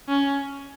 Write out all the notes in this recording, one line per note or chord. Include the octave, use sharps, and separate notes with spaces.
C#4